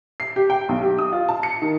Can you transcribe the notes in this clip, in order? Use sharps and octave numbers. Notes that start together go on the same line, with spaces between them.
C7
G4
G5
B1
G4
D#6
F4
A5
C#7
D#3